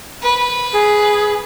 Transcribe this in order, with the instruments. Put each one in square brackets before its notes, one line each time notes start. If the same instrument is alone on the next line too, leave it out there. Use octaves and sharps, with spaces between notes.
[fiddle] B4
[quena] G#4